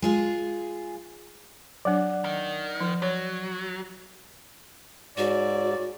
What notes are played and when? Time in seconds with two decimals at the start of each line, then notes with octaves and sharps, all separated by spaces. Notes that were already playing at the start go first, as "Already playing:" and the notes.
0.02 G#3 F4 G#4
1.85 F#3 D4 D5 F#5
2.24 D#3
2.80 F3
3.02 F#3 C#5
5.18 G#2 F#4 C#5 D5